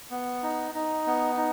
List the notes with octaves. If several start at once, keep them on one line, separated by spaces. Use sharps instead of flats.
B3
D#4
D#4
B3
D#4